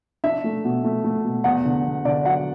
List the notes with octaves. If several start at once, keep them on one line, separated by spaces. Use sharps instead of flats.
D4 E5
A3
B2
A3
A3
B2
E2 F#5
D3
E2
D3 D5
F#3 F#5